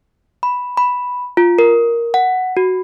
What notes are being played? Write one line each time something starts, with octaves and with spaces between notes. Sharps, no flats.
B5
B5
F4
A#4
F#5
F#4